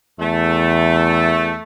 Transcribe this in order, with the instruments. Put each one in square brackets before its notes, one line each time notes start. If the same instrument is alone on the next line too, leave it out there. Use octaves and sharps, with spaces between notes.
[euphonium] E2 [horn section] A3